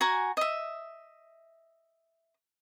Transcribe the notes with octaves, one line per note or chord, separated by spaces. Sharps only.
F#4 G#5 A#5
D#5 E5